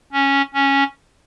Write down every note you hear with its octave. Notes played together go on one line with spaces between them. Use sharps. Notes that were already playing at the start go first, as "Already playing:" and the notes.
C#4
C#4